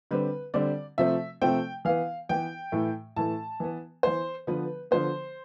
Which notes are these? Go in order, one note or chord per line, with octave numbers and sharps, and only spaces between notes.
D3 G3 C4 B4
D3 G3 C4 D5
C3 F3 A3 C4 E5
C3 F3 A3 C4 G5
E3 B3 F5
E3 B3 G5
A2 E3 A3
A2 E3 A3 A5
E3 B3
E3 B3 C5
D3 F3 B3 B4
D3 F3 B3 C5